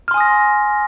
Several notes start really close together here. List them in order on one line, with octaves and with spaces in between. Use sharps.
F6 C6 G#5 D#6 A#6